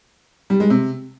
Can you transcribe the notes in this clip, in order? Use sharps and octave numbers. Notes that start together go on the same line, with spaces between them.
G3
G#3
C3